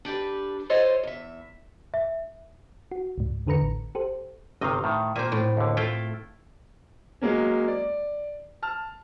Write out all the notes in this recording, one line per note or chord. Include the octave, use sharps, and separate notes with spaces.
D4 G4 A4 B4
E4 F4 A4 C5 C#5 D#5
E2 E5
E5
F#4
C#2 G#2
E2 D3 A4 B4 A#5 C#7
A1
G4 A4 C5
G1 C3 D#3 D#5 F5
A2 D#3
A#2 A#3 C4 C5 G#5
A2
D#2 D3
A3 E4 F4 G5
F#3 G#3 A#3 C#4
D5
A5 F6